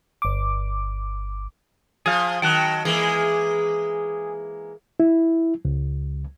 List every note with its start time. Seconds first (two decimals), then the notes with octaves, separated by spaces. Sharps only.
0.22 G1 D6
2.06 F3 G#4 F5
2.42 D#3 F#3 G5 A5 F#6
2.85 E3 G#3 A#3 G#4
5.00 E4
5.65 C#2